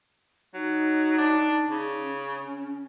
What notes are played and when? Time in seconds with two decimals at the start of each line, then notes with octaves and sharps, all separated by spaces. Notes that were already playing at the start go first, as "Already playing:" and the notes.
0.54 F#3 D#4
1.18 D4
1.69 C#3
2.02 C#4